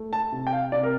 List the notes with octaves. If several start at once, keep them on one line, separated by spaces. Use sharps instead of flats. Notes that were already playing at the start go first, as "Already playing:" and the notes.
Already playing: A3
A5
C3
G5
F5
C3 D5
A#4